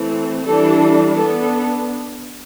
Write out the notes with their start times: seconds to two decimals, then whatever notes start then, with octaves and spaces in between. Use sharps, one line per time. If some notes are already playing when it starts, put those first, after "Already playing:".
Already playing: E3 A3 C4
0.46 E3 G3 D4 A4
1.17 B3 D4 A4